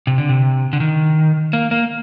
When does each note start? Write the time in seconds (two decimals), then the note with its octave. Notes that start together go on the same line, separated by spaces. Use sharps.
0.07 C3
0.18 D3
0.29 C3
0.73 D3
0.80 D#3
1.53 A#3
1.71 A#3